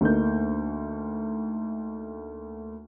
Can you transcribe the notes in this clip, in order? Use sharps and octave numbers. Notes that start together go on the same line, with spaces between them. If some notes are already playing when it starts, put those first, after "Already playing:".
D2 D3 A3 A#3 D#4 G6